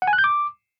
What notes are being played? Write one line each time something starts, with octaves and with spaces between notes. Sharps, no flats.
F#5
G#5
F#6
G6
D6